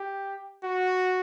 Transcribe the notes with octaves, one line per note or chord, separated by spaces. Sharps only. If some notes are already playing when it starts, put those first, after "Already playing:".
Already playing: G4
F#4